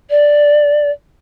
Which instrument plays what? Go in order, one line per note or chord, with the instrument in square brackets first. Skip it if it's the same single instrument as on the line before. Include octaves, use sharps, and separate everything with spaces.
[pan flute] D5